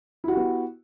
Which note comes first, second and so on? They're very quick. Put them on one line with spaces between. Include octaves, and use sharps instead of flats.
E4 F#4 G4 B3